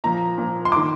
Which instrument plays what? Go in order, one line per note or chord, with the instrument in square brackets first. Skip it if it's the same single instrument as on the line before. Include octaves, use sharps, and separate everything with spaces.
[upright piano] A#2 F3 A#5
A#2 F3
C6
D6
D#3